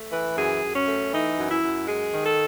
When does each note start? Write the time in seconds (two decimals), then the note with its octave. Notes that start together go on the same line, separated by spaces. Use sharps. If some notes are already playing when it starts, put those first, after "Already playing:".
Already playing: A3
0.12 E3 B4
0.37 F#2 G#4
0.63 F#2
0.75 C#4
0.87 A3
1.12 E3 D#4
1.37 F#2
1.49 E4
1.62 F#2
1.87 G#3 G#4
2.12 D#3
2.25 A4